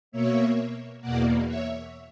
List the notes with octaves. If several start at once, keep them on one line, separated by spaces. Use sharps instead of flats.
B2 A#3 C#5 E5
E2 B2 A#3 D5 F#5
C#5 E5